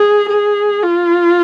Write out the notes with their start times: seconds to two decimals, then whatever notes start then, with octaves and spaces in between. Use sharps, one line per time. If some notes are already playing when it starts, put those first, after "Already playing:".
Already playing: G#4
0.29 G#4
0.83 F4